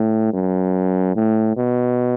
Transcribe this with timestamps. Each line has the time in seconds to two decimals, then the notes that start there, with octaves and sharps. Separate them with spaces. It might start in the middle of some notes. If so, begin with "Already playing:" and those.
Already playing: A2
0.33 F#2
1.16 A2
1.57 B2